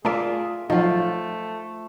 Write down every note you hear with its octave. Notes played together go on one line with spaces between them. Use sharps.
A3 F4 G#4 A#4 D5 E5
F3 F#3 A3 D#4 F4